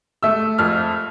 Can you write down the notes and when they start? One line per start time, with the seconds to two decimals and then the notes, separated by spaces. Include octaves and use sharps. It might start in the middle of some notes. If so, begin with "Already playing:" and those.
0.23 A3 E6
0.58 F2 F6